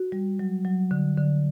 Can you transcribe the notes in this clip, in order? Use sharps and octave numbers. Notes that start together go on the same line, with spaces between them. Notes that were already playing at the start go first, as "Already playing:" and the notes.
Already playing: F#4
G3
F#3
F#3
D3
D3